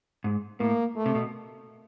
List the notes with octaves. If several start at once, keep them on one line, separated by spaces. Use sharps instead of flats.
G#2
A2 A#3
A3
C3
B2